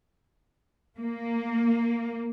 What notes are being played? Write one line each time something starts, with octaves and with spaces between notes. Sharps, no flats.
A#3